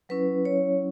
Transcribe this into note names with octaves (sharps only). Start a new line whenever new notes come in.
F#3 C#4 E4 B4
C#5